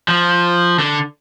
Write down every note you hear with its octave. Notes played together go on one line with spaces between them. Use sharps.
F3
D3